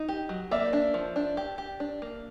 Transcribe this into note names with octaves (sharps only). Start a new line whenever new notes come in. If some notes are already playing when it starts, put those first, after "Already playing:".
Already playing: D#4
G4
F#3
A#3 D5 E5
D4
F3
D4
G4
G4
D4
A#3